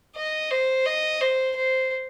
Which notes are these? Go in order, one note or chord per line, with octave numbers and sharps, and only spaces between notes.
D#5
C5
D#5
C5
C5